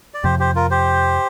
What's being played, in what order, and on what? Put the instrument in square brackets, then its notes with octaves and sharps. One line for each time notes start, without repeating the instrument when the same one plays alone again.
[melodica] D5
[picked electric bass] F2 C3 F3 [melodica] G4 C5
[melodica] G4 C5
F4 A#4
G4 C5